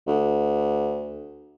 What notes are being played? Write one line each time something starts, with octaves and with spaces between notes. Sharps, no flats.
D2